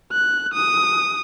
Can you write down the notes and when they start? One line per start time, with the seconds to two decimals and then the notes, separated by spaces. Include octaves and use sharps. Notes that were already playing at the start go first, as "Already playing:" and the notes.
0.12 F#6
0.53 D#6